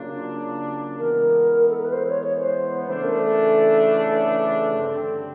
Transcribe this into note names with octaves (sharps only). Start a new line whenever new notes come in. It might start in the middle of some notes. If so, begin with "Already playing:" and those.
Already playing: C#3 F#3 A#3 D4 F4
E3 G#3 B3 A#4
A4
A#4
B4
C5
C#5
C#5
C5
C#3 E3 A3 D4 C5
A#4
A4
A4
G2 D3 G3 C4